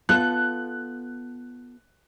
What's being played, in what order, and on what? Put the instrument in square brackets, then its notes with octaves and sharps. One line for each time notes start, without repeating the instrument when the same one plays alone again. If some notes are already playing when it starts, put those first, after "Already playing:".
[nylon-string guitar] B3 F4 A4 [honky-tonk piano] F#6